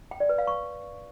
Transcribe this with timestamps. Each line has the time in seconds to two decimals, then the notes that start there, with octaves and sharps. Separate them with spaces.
0.11 G5
0.20 D5
0.29 B4
0.38 F5
0.47 C#6